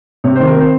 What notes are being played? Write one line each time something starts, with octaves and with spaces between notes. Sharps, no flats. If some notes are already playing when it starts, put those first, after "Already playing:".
C3 C#5
D#3 C5
A#4
C4 C5